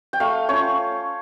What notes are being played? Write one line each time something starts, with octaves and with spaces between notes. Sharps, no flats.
G5
A3 F5
C#4 F4 C#5